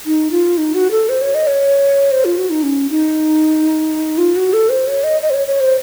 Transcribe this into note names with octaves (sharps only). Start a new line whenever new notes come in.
D#4
F4
D#4
F#4
A4
C5
C#5
D#5
C#5
C5
F4
F#4
D#4
C#4
D#4
F4
F#4
A4
C5
C#5
D#5
D#5
C5
C#5
C#5
C5